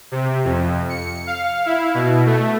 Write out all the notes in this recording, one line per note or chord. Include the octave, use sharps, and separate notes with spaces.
C3
F2
C#7
F5
E4
B2
A3